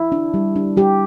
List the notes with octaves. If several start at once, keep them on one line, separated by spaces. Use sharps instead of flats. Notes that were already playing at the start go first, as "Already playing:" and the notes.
Already playing: E4
D4
G3
D4
G3 G4